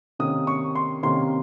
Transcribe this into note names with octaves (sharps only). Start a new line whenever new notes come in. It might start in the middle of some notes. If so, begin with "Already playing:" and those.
C3 D#3 A#3 C#4 D#6
C#6
C6
C3 D#3 A#3 C#4 C6